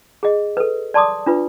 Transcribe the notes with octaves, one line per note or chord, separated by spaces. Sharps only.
G#4 D#5
A4 B4
D5 A5 C6 D6 D#6
D4 F4 B4